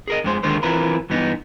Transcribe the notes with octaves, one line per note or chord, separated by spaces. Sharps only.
G#4 A#4 D#5
F2 G#3 C5
D#2 D3 D#3 G#3 A#4 C5
E3 F3 C4 E4 A#4 B4
G2 E3 B3 D#4